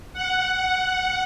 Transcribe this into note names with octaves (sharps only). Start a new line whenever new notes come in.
F#5